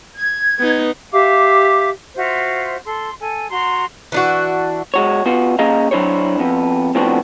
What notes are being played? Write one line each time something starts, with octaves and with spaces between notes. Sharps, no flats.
G#6
B3 D#4
G4 E5 F5 D6
F4 F#4 C5 E5
A4 C6
A4 G#5
F#4 A#5 C6
E3 D4 F#4
G#3 F#4 C#5
B3 F4 F#4
A#3 C#4 G#4 D#5 F5 A#5
F#3 D4 E4 C5 C#5
F2 B3
A2 F3 B3 C4 D4 F#4